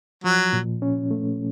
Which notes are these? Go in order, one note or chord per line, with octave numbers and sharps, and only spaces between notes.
F3 F#3
A#2
C#4
A3